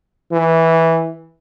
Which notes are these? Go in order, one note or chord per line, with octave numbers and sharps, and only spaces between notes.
E3